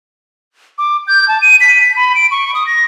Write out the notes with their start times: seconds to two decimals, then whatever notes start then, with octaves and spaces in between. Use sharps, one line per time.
0.78 D6
1.07 G6
1.28 A5
1.42 D#7
1.61 B6
1.81 B6
1.97 B5
2.15 D7
2.31 C#6
2.54 D#6
2.67 A#6